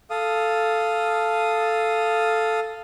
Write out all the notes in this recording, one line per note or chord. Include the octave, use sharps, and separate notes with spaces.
A4 F5 D#6